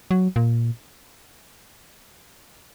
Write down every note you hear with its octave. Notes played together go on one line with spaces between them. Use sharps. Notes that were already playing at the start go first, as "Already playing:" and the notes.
F#3
A#2